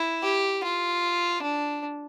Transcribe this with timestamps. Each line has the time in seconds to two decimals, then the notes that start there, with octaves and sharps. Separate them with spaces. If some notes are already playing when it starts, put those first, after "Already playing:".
Already playing: E4
0.22 G4
0.63 F4
1.42 D4